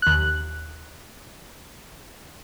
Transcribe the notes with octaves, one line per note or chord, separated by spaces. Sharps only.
D#2 F#6